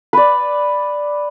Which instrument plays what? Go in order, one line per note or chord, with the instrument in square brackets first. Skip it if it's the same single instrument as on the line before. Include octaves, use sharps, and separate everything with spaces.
[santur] B4 D5